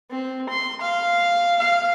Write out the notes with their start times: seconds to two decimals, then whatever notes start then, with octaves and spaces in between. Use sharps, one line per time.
0.11 C4
0.49 C6
0.81 F5
1.59 F5